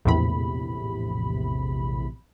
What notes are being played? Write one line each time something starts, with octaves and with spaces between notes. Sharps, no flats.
A#1 E2 A2 C3 B5